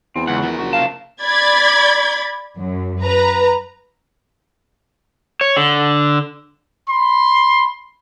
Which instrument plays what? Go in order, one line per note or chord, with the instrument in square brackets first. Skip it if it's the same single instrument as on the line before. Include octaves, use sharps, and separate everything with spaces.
[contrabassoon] E2 [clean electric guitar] C4
[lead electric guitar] C#2 [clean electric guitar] F#5
[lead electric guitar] F3 A#4
[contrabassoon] F#1 [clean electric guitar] F#4
[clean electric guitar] C3 A5 [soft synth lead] F5
[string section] D5 B5 G#6 A6
F#2
B4 A#5
[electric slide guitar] C#5
D3
[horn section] B5 C6